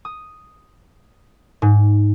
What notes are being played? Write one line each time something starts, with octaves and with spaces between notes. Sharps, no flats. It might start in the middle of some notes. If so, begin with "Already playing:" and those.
D#6
G#2